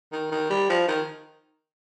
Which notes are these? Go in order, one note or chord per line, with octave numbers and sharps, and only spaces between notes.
D#3
D#3
G3
F3
D#3